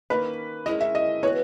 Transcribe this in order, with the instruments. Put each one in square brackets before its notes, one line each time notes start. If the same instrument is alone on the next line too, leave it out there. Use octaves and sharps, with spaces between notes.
[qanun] D#3 A#3 C#4 [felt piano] B4
[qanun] G#3 C#4 E4 A#4 [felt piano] D#5
[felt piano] E5
D#5
[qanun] E3 B3 F#4 [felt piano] C#5